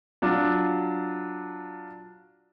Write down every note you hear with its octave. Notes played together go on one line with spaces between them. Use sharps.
F#3 D4 F4